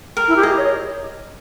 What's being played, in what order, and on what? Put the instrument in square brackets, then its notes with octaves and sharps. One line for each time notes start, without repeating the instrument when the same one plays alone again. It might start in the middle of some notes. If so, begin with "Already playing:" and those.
[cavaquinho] A#4
[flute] E4
G4
[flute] G#4 [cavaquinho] D#5
[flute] C#5